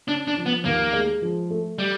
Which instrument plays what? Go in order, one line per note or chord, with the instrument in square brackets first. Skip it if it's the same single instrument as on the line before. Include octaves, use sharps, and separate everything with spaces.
[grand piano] C#3 [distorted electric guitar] D4
[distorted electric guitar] D4
[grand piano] F3
[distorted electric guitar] B3
[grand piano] D#2 [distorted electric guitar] A#3
[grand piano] G#3
F3
A3
[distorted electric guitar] G3